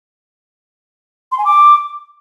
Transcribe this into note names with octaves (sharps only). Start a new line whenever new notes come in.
C6
G#5
D6